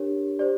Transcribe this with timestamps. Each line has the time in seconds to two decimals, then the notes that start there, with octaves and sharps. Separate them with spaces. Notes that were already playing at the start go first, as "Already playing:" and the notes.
Already playing: D4 G4 A#4 C#5
0.39 G4 C5 D5